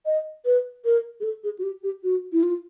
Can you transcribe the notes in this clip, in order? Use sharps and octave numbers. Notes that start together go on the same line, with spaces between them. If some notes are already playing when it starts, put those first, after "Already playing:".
D#5
B4
A#4
G#4
A4
G#4
F#4
G4
G4
F#4
E4
F4